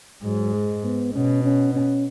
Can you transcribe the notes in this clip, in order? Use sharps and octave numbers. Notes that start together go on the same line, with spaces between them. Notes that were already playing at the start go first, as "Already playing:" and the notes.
G#2 F#3
G#3
B3
B2 C#4
C#4
C#4